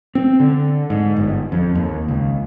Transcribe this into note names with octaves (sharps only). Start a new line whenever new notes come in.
C4
D3
G#2
G1
F2
D#2
C#2